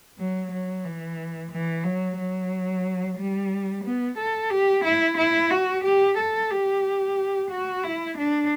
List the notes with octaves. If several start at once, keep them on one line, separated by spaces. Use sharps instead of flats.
F#3
F#3
E3
E3
F#3
F#3
G3
B3
A4
G4
E4
E4
F#4
G4
A4
G4
F#4
E4
D4